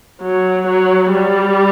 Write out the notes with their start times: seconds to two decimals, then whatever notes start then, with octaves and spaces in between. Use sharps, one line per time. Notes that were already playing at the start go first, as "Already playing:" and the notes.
0.22 F#3
0.68 F#3
1.12 G3